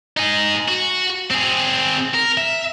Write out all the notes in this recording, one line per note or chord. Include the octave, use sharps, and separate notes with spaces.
D#4 G#4
F#4
C4 G#4
A#4
E5